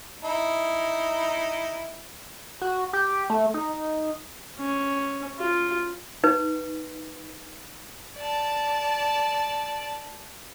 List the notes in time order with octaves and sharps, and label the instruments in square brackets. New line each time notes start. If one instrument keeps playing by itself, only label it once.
[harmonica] D#4 E4
[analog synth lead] F#4
G4
A3
D#4
[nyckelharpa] C#4
F4
[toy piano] D#4 B4
[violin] D5 A5